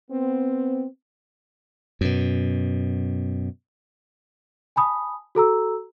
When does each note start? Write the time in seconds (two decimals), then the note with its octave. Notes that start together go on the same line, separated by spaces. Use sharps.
0.11 B3 C4
2.01 F#2 B2
4.76 G#5 A5 B5 D#6
5.35 F#4 A4 A#5 E6